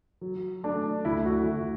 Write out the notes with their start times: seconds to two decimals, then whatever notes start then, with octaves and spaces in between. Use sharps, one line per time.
0.21 F#3
0.63 A3 D4
1.05 D2 E4
1.25 F#4
1.46 D2